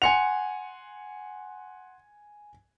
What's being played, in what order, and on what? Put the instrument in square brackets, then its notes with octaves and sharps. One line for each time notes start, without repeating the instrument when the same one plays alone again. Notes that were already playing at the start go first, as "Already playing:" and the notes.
[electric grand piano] F#5 C6 [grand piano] G#5 C#7 F7